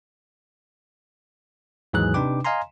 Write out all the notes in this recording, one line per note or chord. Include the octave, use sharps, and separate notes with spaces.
D#2 G#2 E3 F#3 G#4 F#6
C3 D4 D#4 B4 G5 D6
D#5 F5 G#5 A#5 C6